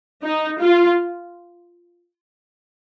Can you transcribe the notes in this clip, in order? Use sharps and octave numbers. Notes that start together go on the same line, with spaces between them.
D#4
F4